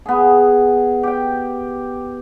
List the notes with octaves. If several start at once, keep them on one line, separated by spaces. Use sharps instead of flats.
B3 G#4
G4 G5